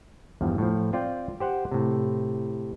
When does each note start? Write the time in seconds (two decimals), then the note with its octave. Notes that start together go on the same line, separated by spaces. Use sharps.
0.41 E2 G2 F3
0.58 A2 F3
0.93 C4 F4 D5 G5
1.40 G4 C5 F#5
1.71 A2 C3